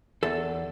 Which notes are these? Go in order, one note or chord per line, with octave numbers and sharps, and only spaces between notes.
E2 A4